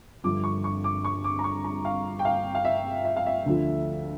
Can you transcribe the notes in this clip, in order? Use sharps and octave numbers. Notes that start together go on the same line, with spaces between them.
G1 G2 F3 D6
C#6
C#6
D6
C#6
D6
A#5
C#6
A#5
F5
G5
F5
F5
E5
E5
F5
E5
D2 D3 F3